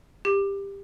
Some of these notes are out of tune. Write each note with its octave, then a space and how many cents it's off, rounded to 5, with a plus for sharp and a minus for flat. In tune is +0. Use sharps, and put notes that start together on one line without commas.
G4 +15